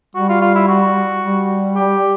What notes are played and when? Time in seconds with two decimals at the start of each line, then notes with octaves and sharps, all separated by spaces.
0.15 G3 F#4
0.29 F4
0.42 F4
0.55 E4
0.68 F#4
1.23 G3
1.76 G4